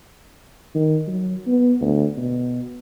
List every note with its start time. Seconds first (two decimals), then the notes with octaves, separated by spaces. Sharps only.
0.75 D#3
1.07 F#3
1.47 B3
1.81 D2
2.17 B2